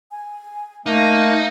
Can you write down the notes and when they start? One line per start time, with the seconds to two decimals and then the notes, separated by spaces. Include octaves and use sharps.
0.11 G#5
0.86 A3 A#3 D#4 F5